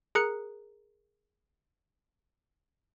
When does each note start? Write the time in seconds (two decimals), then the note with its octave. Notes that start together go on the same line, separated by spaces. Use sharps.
0.15 G#4 A#4 A#5 F#6 C#7